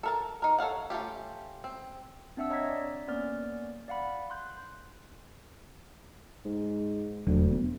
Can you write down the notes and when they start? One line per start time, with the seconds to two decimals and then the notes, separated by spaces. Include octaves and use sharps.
0.03 A4 A#4 A5
0.42 D#4 A#4
0.59 A4 C#5 F5 F#5
0.90 A3 C#4 F4 G4
1.64 C4
2.37 C4 D4 E5 F#5 E6
2.50 C#5 D#5 A#5 E6 G#6 B6
2.69 D5
3.08 A#3 B3 C#4 D5 F6
3.88 D5 F5 F#5 B5
4.30 C6 F#6 G6
6.46 G#2
7.27 E1 D2 F#3
7.52 B3